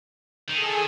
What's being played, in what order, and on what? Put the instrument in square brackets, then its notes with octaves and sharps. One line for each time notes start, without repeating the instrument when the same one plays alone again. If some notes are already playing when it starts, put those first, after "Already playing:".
[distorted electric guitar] D#3 [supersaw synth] G#4 A4